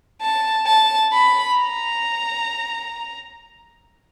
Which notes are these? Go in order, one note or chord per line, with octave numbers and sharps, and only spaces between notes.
A5
A5
B5
A#5